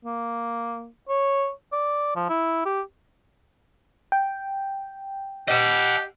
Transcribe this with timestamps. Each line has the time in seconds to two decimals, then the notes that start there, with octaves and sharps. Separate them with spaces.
0.05 A#3
1.09 C#5
1.73 D5
2.16 F3
2.29 E4
2.66 G4
4.12 G5
5.48 G4 D#5 F#5